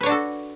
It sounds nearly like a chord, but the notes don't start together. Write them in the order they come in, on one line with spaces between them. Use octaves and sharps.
B4 C#5 D4 F#4 A4